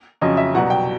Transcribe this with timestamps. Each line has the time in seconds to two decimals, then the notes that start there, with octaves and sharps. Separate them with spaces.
0.21 F2 C#3 F#3 D#5
0.37 E5
0.54 C2 B2 F#3 F#5
0.70 G5